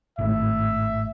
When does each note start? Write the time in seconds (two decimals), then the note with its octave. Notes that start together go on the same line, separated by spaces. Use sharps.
0.19 G#1 A2 E5